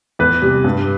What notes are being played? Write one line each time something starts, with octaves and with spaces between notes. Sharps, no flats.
E2 B4
C3 G3
G2